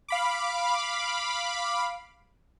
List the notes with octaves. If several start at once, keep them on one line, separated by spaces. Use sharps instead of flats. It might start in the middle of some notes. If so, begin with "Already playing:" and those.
F5 B5 D6